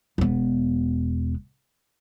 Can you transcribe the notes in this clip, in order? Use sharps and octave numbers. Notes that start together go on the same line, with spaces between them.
E1 B3